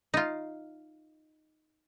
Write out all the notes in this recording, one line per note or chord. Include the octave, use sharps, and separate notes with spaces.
D#4 F4